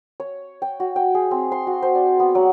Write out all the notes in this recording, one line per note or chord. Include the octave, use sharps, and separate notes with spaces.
C#5
G5
F#4
G5
G#4
C4
C6
F#4
C5
D5
B3
F#3